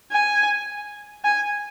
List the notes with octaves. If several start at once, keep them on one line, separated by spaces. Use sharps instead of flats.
G#5
G#5